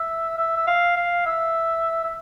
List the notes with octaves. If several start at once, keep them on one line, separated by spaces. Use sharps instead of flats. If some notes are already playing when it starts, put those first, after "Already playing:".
Already playing: E5
E5
E5
F5
F5
E5
E5